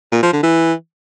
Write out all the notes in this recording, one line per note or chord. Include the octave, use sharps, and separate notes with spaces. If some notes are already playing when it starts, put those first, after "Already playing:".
A#2
F3
D3
E3